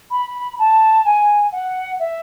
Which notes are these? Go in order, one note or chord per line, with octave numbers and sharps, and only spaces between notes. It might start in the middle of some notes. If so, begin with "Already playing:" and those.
B5
A5
G#5
F#5
E5